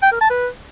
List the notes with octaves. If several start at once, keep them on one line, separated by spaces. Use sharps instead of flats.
G5
A#4
A5
B4